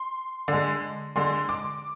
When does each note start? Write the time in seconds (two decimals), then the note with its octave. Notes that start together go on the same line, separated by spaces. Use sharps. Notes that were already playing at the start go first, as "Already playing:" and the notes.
Already playing: C6
0.48 D3 G#3
1.16 D3 G#3 C6
1.49 D6